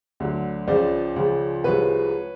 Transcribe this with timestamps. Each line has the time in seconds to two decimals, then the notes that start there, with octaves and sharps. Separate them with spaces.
0.20 D2 D3 F#3
0.67 C#2 C#3 F3 C5 D5
1.16 C#2 C#3 F3
1.64 C2 C3 F3 G#3 B4 C#5